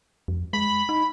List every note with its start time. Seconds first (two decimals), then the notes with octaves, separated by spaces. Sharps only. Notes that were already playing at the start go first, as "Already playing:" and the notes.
0.28 F2
0.53 G#3 B5
0.89 D#4